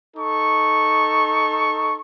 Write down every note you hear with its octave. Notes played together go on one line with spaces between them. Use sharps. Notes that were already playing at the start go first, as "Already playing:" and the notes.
D#4 A4 C#6